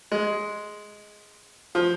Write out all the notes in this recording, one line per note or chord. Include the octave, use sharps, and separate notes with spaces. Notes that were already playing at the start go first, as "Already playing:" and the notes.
G#3
F3